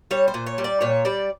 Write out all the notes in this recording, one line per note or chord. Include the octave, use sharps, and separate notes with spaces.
G3 C#5
C5
A#2
C#5
G3
D5
A#2 C#5
G3 D5